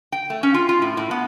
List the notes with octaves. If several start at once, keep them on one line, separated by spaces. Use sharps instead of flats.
G5
A3
C#4
F4
F4
A2
A2
B3